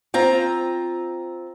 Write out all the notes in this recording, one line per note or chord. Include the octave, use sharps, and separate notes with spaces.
C4 F4 A#5